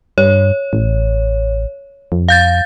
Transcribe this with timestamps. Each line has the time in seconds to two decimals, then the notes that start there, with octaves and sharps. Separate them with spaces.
0.18 G2 C#5
0.73 A1
2.12 F2
2.28 F5 G6 A6